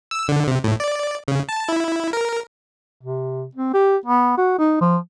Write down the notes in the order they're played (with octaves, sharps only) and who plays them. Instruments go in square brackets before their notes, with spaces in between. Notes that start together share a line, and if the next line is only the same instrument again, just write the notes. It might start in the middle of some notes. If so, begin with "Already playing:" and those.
[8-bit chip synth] E6
D3
C3
A2
D5
C#3
A5
E4
A#4
[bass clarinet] C3
C4
G4
B3
F#4
D#4
F3